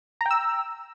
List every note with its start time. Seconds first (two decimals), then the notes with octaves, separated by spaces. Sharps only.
0.21 A#5
0.26 G5
0.31 E6